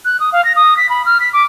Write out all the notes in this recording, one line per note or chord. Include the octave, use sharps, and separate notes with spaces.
F#6
D#6
F5
A#6
D#6
B6
B5
F6
B6
D6